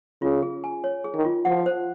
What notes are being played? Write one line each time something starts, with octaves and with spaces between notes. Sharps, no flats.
C#3 F4
G#4
G#5
C#5
G#4
D#3
F4
F3 F#5
C5